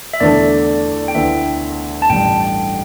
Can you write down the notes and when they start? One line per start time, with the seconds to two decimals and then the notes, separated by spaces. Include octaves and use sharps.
0.13 E5
0.20 E2 D3 A3 D4 A4 D5
1.08 G5
1.15 D2 D3 A3 E4 B4 E5
2.02 A5
2.09 A1 G2 G3 G5